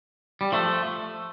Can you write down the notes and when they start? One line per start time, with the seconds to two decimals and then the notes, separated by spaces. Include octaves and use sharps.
0.41 G3
0.52 F3 A3